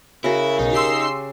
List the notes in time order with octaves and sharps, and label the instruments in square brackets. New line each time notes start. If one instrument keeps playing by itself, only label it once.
[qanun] C#3 F#4 A#5 [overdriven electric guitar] E4 [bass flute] A#4
[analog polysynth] B1 [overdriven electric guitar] D#4
[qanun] G4 [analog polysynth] C6 E6 C7